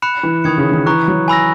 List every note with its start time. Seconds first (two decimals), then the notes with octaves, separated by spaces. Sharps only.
0.02 B5 F#6 C#7 E7
0.23 E3
0.44 D#3 B5 D#6 G#6 C#7
0.58 C#3
0.72 D#3
0.86 E3 A#5 C#6 F#6
1.08 F#3
1.28 G#5 B5 E6 A#6